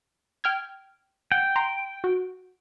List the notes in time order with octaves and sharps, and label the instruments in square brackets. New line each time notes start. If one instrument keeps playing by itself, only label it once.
[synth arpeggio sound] G5 F6 G#6
[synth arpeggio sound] F#5 [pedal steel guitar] G5
[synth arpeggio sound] A#5 C6
F#4